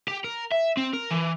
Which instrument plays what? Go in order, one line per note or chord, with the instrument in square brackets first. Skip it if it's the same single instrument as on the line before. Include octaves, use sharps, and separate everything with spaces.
[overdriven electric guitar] G4
A#4
E5
C4
A#4
E3